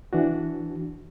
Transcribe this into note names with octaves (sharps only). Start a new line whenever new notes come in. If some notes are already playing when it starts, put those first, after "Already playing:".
E3 D4 F#4